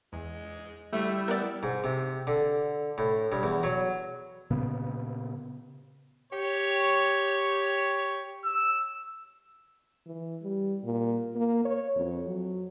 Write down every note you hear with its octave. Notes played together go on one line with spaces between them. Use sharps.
E2 G#3
G3 A3 E4
B3 A#4 D5
G#2
C3
D3
A2
G2
E2
F#3
A#2 C#3 B3
G4 C#5
E6
E3
G3
A#2
A#3
C#5
F2
F#3